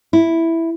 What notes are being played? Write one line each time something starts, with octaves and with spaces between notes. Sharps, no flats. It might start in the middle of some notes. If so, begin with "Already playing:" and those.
E4